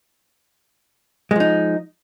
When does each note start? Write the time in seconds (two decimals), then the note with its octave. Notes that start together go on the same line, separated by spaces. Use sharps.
1.31 G#3
1.36 F3
1.40 D#4